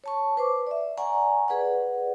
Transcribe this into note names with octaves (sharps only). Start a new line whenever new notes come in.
C#5 A5 C#6
B4 C5 D6
D5 E5
D5 F#5 G#5 A#5 C#6
G#4 B4 D5 F#5